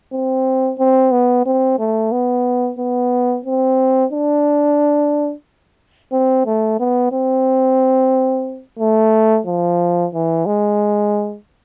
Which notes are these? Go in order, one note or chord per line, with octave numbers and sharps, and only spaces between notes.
C4
C4
B3
C4
A3
B3
B3
C4
D4
C4
A3
B3
C4
A3
F3
E3
G#3